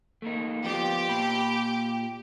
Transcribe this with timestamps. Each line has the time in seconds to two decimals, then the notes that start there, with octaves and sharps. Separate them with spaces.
0.22 A3 A#3 D#4
0.64 F3 B3 F4 G4
1.08 A#2 B5